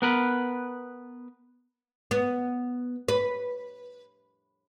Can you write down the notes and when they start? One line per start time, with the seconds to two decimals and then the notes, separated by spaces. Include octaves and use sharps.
0.02 B3 A#4 B4
2.11 B3
3.08 B4